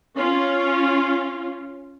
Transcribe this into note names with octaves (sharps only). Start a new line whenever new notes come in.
C#4 F4